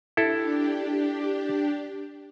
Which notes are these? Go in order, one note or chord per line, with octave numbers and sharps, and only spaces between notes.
D4 E4 G4 A4